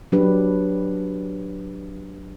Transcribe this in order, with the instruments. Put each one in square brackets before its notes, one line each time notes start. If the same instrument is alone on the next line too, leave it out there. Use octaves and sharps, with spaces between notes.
[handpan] F#3 D4 G4 B4